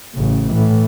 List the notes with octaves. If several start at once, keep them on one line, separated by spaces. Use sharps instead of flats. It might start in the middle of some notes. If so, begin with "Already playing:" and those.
A1 C#3
A2 E3